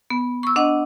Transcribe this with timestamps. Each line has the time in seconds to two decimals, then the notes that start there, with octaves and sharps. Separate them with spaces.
0.10 B3
0.43 C#6 E6
0.56 D4 D#5 F#5